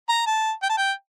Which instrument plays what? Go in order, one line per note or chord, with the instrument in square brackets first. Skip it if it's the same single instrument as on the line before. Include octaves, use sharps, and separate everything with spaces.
[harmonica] A#5
A5
G5
A5
G5